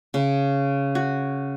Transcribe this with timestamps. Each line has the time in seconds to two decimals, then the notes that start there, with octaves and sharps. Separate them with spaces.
0.14 C#3
0.95 F#4